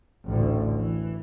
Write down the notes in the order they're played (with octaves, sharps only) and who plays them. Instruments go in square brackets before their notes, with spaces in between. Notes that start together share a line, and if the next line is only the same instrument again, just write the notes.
[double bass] A1 D2
E3